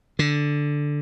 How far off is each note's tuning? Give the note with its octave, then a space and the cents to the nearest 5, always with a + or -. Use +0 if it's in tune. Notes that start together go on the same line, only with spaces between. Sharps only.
D3 +0